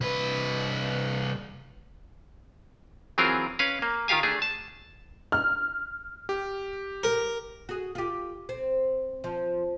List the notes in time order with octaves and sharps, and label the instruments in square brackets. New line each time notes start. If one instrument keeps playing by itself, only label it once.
[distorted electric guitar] C2 B4
[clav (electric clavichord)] E3 F#3 C4 F4 G#4 A#4
C#4 B4 F5
A#3
D#3 F4 G4 F5 G#5
A3 D4 G#4
A5
[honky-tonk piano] F6
[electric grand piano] G4
[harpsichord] A#4
[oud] F#4 G#4
F4 G4
C4
F3